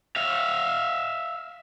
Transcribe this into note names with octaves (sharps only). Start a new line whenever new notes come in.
E5 F5